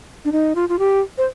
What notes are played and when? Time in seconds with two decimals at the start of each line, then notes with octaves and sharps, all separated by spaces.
0.25 D4
0.32 D#4
0.55 F4
0.69 F4
0.79 G4
1.18 C5